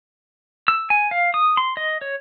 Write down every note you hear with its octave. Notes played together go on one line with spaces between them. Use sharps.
E6
G#5
F5
D#6
C6
D#5
C#5